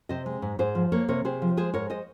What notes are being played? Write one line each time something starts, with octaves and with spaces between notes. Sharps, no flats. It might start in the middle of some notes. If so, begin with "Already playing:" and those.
C3 C5 D#5
G#3
G#2
G#2 G#4 C5
F3
A#3 A#4 C#5
C3 A#4 C#5
C3 G#4 C5
F3
G#3 G#4 C5
G#2 A#4 C#5
C5 D#5